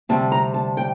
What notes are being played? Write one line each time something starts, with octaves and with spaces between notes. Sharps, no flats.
D2 C3 G3 C4 A5
A#5
A5
G5